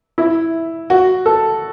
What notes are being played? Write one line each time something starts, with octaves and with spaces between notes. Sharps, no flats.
E4
F#4
A4